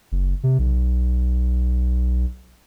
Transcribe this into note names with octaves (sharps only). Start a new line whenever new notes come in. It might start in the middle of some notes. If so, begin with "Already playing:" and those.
F#1
C3
B1